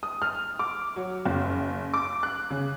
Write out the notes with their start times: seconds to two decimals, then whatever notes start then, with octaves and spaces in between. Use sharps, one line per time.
0.03 D#6
0.22 F6
0.59 D6
0.96 F#3
1.25 F#1
1.94 D6
2.23 F#6
2.50 C#3